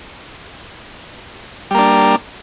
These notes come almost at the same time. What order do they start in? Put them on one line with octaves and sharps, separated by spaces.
G3 A#3 D4